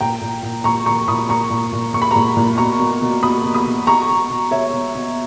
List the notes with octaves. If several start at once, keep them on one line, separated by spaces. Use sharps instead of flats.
A#2 G5 A#5
A#2
A#2
A#2 A#5 C#6
A#2 A#5 C#6
A#2 B5 D#6
A#2 A#5 C#6
A#2
A#2
A#2 C#6
B5
A#2 A#5 C#6
A#2
B2 A#5 C#6
B2
B2
B2 B5 D#6
B2
B5 D#6
B2
B2 A#5 C#6
B2
B2
B2 C#5 E5
B2
B2